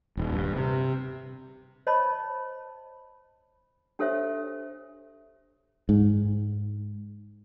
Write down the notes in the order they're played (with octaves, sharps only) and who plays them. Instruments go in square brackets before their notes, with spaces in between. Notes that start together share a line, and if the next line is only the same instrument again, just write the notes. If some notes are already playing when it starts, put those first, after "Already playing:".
[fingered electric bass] D#1
G2
C3
[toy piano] C5 C#5 D#5 A5 B5
D4 G4 A4 C5 C#5 E5
[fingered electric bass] G#2